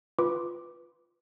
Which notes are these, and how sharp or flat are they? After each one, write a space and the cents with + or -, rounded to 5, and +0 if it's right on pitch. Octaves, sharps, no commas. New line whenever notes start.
F4 +0 B4 +0 D6 +0